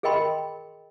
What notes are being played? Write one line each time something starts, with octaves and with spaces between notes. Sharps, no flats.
G#4 A#4 D#5 G5 B5 C6